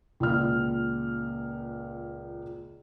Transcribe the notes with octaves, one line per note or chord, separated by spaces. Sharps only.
C#2 A#2 F6